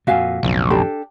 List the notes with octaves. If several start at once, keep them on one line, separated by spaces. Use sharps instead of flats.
F2 A#2 F#4 F5 G#5
B1 F2 A2 C#3
D4 G4 A4